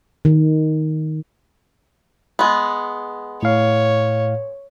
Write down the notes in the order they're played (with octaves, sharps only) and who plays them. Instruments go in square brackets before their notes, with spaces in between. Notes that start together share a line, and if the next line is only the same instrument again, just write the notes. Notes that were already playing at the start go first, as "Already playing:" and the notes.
[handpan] D#3
[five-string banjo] G#3 B3
[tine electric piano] A2 F5 [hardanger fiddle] C#5